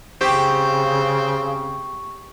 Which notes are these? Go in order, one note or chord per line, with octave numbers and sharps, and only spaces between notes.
C#3 C4 G4 C#6